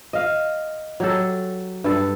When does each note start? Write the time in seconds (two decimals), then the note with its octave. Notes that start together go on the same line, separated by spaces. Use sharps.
0.13 D#5 F5
1.00 F#3 G4 A4
1.84 G2 A4